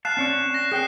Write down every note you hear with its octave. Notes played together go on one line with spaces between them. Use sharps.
F5 A5 F#6 C7 E7
C4 C#4 D5
A#6
G#4 G5 F#6 C7